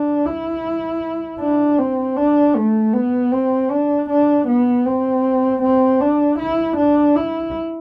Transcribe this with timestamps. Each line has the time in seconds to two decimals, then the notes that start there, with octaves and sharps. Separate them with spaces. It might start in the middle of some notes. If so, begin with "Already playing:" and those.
Already playing: D4
0.26 E4
1.40 D4
1.78 C4
2.17 D4
2.56 A3
2.93 B3
3.32 C4
3.70 D4
4.09 D4
4.48 B3
4.85 C4
5.62 C4
6.01 D4
6.39 E4
6.77 D4
7.16 E4